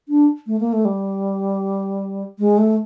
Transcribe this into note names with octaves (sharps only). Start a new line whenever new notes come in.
D4
A3
A#3
A3
G3
G#3
A3